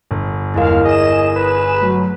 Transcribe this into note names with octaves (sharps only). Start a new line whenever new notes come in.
G1
E2 G#3 E4 A#4 F5
G#4 D#5 E7
B4
F#3 A3